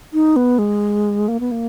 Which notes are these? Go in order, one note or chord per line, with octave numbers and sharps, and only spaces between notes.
D#4
B3
G#3
A#3
B3
A#3